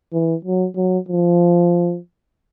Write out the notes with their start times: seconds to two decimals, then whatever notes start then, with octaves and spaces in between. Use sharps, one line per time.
0.13 E3
0.45 F#3
0.76 F#3
1.09 F3